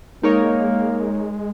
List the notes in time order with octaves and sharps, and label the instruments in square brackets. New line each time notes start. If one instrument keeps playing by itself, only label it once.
[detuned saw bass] G#3 [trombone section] A#3 [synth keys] D#4 A#4 C#5